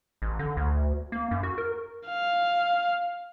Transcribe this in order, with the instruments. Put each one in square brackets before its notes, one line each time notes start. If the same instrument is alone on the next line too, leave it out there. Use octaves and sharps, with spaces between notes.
[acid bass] A1
D3
D2
A#3
F#2
F#4
A#4
[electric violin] F5